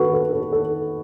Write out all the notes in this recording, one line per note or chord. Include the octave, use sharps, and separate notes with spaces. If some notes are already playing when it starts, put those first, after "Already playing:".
Already playing: F#4 A4 B4
A4
A4
A4